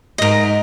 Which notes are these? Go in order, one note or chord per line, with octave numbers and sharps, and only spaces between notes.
G#2 A#4 D#5